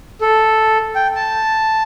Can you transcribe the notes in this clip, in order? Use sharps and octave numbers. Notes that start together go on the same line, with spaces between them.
A4
G5
A5